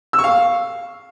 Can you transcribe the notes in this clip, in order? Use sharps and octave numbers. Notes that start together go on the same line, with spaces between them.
E6
C#6
F5